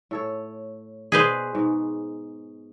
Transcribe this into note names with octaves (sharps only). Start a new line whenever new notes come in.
A2 A4 C#5
B2 G#4 B4 C5 D5
G#2 B2